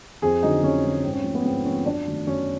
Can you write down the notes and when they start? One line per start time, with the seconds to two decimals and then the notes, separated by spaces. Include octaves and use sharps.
0.22 F2 G#4
0.43 D3 F#3 D#4
0.63 F2 C#4
0.84 D3 F#3
1.04 G#2 C4
1.14 C#4
1.24 F3 A3
1.35 B3
1.45 G#2 C4
1.65 F3 A3 C#4
1.85 F#2 D4
2.06 D#3 F#3 A3
2.27 F#2 C#4